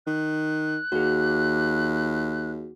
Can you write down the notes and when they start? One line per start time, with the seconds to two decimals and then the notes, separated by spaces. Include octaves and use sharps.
0.07 D#3 F#6
0.92 D#2 F#4 G#4